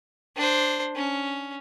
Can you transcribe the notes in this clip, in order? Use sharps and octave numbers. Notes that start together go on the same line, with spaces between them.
D4 C5
C#4